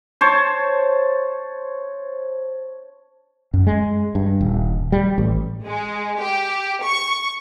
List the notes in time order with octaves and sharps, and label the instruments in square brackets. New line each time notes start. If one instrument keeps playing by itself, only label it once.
[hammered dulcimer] C5 C#5 A5
[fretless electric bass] F#2
G#3
G2
D#1
G3
A1
[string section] G#3
G4
C#6